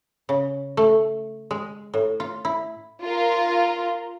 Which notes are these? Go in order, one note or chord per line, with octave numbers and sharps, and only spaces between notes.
C#3
A3
G#3
A2
F4
E4
F4 A#4